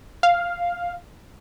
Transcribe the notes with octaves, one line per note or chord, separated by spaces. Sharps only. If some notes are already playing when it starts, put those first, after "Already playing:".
F5